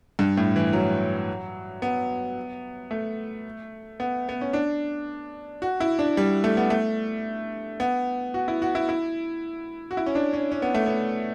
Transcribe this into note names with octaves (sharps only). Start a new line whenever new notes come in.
G2
A2
E3
F#3
B3
A3
B3
B3
C#4
D4
F#4
E4
D4
G3
A3
B3
A3
B3
F#4
E4
F#4
E4
E4
F#4
E4
C#4
D4
C#4
C#4
B3
A3
B3